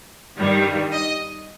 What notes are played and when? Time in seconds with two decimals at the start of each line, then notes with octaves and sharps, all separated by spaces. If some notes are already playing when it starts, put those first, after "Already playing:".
0.38 G2 D#3 G3
0.92 D#5